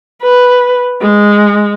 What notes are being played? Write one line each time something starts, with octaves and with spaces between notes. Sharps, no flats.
B4
G#3